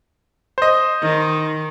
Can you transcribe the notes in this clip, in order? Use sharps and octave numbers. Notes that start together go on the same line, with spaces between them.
C5 D#5
D#3